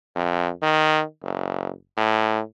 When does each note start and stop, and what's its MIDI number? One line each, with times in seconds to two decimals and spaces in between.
0.16 0.50 41
0.62 1.02 51
1.22 1.71 30
1.97 2.41 45